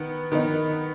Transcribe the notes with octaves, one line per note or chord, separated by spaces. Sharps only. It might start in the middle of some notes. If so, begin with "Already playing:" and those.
Already playing: D#3 B3
D#3 B3 D#4